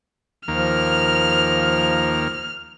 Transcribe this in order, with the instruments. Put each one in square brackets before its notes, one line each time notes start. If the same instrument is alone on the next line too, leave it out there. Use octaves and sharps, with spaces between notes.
[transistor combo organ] D#2 A#3 [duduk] F3 [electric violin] F6